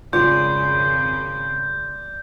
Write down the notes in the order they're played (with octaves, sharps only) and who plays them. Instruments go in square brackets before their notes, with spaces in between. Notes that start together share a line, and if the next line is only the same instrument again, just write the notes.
[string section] G#1 F2 C#3 [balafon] F4 [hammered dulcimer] D5 C6 [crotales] G6